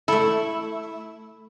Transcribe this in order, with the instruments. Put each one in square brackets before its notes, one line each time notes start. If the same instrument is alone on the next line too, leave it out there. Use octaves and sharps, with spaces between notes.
[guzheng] A3 A4 [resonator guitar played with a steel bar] E4